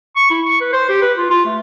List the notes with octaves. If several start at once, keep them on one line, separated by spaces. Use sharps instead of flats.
C#6
E4
C#6
B4
C5
G4
B4
F4
F4
A3